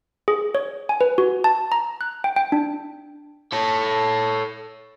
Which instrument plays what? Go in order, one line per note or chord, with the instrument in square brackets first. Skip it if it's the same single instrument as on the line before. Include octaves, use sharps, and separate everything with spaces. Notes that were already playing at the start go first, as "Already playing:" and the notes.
[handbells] G#4
C#5
G#5
B4
F#4
A5
A#5
F#6
G5
G5
D4
[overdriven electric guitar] A4 C#5